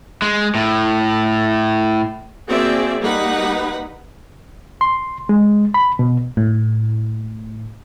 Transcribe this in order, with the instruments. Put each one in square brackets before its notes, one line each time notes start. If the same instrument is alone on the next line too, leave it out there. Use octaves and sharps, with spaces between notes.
[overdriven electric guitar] G#3
A2
[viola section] A#3 C4 F#4 G#4 D5 E5
G3 A#3 D#4 B4 F#5
[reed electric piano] C6
G#3
B5
B2
[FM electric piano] A2